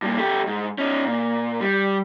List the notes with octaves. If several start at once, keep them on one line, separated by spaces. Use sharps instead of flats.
G2 A#2
A3 G4
G#2
C#4 D#4
A#2
G3